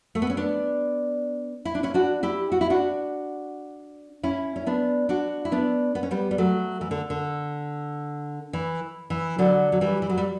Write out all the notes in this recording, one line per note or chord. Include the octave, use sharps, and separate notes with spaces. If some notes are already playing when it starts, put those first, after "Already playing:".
A3
B3
C#4
B3 D4
E4
D4
C#4 E4
D4 F#4
E4 G4
F#4
E4
D4 F#4
C#4 E4
C#4
B3 D4
D4 F#4
E4
B3 D4
B3
C#4
G3 B3
G3
F#3 A3
E3
D3
D3
E3
E3
D3 F#3
F#3
E3 G3
E3
F#3
G3